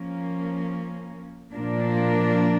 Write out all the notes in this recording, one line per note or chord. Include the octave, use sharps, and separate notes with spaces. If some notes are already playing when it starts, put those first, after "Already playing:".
Already playing: F3 A#3 C#4
A#2 F3 A#3 D4